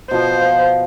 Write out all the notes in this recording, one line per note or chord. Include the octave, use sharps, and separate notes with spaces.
B2 F3 F4 C5